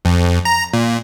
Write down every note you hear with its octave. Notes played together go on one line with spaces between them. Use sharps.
F2
A#5
A#2